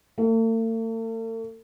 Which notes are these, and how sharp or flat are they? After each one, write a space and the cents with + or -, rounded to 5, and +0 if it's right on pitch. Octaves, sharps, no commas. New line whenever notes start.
A3 +45